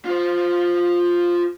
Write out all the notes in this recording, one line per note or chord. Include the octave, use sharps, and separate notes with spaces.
F4 C5